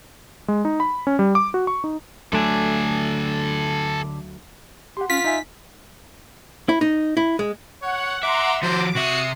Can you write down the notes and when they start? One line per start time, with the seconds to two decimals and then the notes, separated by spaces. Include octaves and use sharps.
0.48 G#3
0.65 D#4
0.80 B5
1.07 C#4
1.19 G3
1.35 D6
1.54 F#4
1.67 C#6
1.84 D#4
2.33 D2 D3 F#3 A3 D4 A4 G#5
4.97 G4 F#5 C6
5.10 C#4 F4 B6
5.24 D#4 E5 G#5
6.69 E4
6.81 D#4
7.17 E4
7.39 G#3
7.82 C#5 F#5
8.23 E5 F#5 A#5 C6 D6
8.63 F3 F#4 C5 D6
8.95 C3 F#4 E5 D#6 C7 C#7